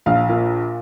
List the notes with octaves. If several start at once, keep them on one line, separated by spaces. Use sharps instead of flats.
A#1 F5
A#2